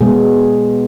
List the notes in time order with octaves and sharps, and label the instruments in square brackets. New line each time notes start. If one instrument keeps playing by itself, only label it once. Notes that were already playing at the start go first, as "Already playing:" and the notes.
[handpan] B2 G#3 B3 G#4